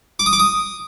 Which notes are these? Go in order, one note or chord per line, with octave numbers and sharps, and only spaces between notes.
D6
D#6
D6
D#6